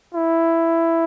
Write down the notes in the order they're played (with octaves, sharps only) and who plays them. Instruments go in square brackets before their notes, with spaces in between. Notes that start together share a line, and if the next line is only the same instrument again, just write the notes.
[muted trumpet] E4